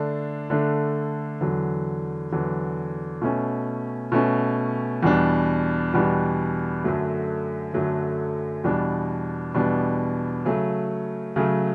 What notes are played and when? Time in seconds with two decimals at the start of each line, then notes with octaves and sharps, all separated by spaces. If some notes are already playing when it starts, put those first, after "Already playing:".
Already playing: D3 A3 D4
0.50 D3 A3 D4
1.41 E2 D3 F#3
2.32 E2 D3 F#3
3.22 B2 A3 C#4
4.12 B2 A3 C#4
5.03 E2 B2 G3 D4
5.94 E2 B2 G3 D4
6.84 F#2 D3 F#3 A3
7.74 F#2 D3 F#3 A3
8.64 E2 B2 G3 D4
9.54 E2 B2 G3 D4
10.45 C#3 F#3 A3
11.36 C#3 F#3 A3